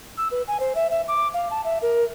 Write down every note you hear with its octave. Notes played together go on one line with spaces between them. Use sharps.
E6
B4
G#5
C5
E5
E5
D6
F5
A5
E5
A#4